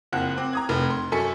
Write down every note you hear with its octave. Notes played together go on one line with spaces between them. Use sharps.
F#1 F2 F#5 F#6
C4 D6
A#5 D#6 G#6
F1
C6
F#2 A4 G#5 C#6 B6 C#7